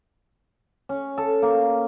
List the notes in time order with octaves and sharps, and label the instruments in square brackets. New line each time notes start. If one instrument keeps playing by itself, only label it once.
[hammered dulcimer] C#4
A4
A#3